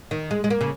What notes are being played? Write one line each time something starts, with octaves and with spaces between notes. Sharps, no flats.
D#3
G#3
G#3
A#3
C#3